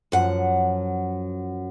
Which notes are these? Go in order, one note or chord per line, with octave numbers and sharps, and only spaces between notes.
F#2 F3 F#5